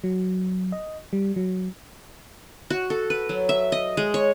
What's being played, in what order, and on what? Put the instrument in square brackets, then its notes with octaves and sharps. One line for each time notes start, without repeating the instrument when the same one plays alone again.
[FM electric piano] F#3
D#5
G3
F#3
[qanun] F#4
A4
B4
F#3
E5
D#5
G#3
C#5